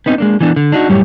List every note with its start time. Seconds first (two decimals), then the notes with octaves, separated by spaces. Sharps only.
0.06 B3 C4 D#4
0.18 G#3 A#3 D4
0.41 E3 B3 D4
0.56 D3
0.72 D4 D#4 F4 F#4
0.89 F#2 A2 G3 G4 C#5